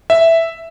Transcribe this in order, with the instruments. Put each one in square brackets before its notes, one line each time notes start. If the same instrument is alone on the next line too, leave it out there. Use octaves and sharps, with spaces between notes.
[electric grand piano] E5